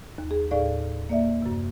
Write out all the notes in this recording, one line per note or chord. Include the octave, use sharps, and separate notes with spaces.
D#2
G#4
D#2 A2 G#4 D5 F5
A#3 D5 E5
F#2 C3